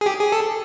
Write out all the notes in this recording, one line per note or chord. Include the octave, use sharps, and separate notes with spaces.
G#4
G4
G#4
A4